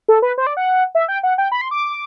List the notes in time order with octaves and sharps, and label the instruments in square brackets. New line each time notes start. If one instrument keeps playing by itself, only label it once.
[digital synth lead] A4
B4
C5
D5
F#5
E5
G5
F#5
G5
B5
C6
D6